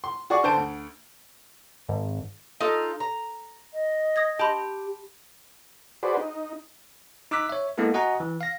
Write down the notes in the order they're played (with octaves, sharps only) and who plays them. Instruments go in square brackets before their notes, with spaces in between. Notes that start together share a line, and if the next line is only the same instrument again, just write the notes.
[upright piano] C6
F#4 G#4 D5 C#6
D3 C5 A5 D7
D2
[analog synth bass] G#1
[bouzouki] D#4 F4 A4
A#5
[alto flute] D#5
[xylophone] D#6 G#6 A#6
[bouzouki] G4 [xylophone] A5 B5 C6
[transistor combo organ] F#4 G#4 B4 C5 D5
D#4
[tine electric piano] D#4 D6 E6 F#6 B6
C#5 E5
G#3 A#3 B3 E4 A4
F#4 D#5 F#5 G#5 A#5
E3
F5 A#6